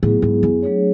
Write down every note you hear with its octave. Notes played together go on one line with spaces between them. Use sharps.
A2 F#3 B3 E4 G#4
G#2
F#2
F#3 A3 D4 G#4 C#5